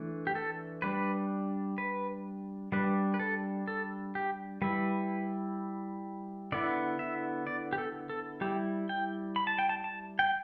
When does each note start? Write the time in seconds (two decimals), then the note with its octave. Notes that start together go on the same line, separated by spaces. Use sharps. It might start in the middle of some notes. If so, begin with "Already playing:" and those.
Already playing: E3 A3 D4
0.27 G4
0.35 A4
0.82 G3 D4 B4
1.78 B4
2.72 G3 D4 B4
3.14 B4
3.19 A4
3.68 A4
4.15 G4
4.62 G3 E4 B4
6.52 D3 B3 E4 D5
6.99 E5
7.47 D5
7.73 G4
7.78 A4
8.10 A4
8.41 G3 E4 G4
8.89 G5
9.36 B5
9.47 A5
9.59 G5
9.69 A5
9.84 A5
10.19 G5